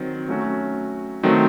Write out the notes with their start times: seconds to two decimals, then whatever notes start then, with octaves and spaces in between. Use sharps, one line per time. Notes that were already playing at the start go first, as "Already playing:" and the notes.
Already playing: D#3 F#3 C4
0.28 F#3 A3 C#4 F#4
1.23 D#3 F#3 A3 C4